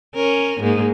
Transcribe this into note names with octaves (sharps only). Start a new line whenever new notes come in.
C#4 A#4
G#2 A#3